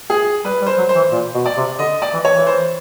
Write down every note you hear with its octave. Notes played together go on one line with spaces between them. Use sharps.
G#4
G3 B4
G3
C5
F#3
C5
E3
A#2
B2
D5
C3
D3 D#5
D5
E3
C#5
E3
C5